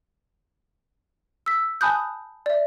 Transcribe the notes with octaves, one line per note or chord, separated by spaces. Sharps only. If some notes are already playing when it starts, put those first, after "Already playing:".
E6 B6
G#5 A5 B5 D#6 F#6 G6
D5 E5